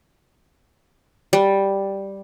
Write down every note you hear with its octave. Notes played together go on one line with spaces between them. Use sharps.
G3